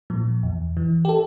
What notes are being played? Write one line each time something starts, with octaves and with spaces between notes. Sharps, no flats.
A#2 F3
E2
E3
G4
A4